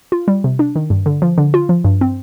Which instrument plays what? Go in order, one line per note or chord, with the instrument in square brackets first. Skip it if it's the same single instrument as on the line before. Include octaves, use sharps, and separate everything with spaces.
[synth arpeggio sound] F4
G3
C3
D4
D#3
G2
D3
F3
D3
F4
F3
G2
C4